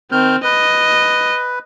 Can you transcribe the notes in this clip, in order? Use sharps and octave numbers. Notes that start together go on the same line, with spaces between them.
D#3 C4 F6 G6
B4 D#5